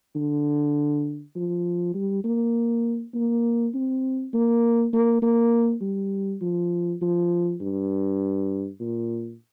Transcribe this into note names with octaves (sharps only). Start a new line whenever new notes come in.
D3
F3
G3
A#3
A#3
C4
A#3
A#3
A#3
G3
F3
F3
G2
A#2